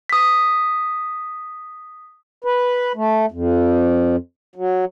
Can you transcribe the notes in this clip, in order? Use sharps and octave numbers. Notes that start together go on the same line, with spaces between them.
D#6 B6
B4
A3
F2
F#3